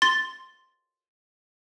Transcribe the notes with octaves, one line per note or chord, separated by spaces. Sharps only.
C6 A6 G7